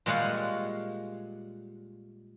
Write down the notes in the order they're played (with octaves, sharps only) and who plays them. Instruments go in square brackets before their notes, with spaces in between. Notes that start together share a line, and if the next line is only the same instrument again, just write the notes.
[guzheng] A#2 G3 G#3 C#5 F5 F#5